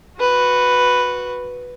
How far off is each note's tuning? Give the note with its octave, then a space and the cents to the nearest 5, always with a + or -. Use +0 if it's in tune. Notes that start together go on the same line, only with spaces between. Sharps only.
F#4 -10 B4 +0